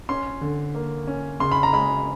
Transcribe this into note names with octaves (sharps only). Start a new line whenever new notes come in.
C#4 C6
D3
A#3
C#4
C#3 C6
B5
A#5
G#3 B5